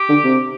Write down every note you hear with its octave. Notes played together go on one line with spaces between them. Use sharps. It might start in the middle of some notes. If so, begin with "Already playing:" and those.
Already playing: G4
D3
C3